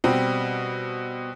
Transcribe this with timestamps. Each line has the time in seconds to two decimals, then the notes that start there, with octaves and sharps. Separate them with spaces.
0.04 B2 G3 C4